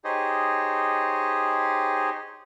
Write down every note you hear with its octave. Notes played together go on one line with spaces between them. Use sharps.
D#4 G4 G#4 C5 C#5 D#5